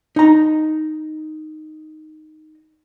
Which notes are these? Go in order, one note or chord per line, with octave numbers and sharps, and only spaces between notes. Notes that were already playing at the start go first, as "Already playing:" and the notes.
D#4 A#5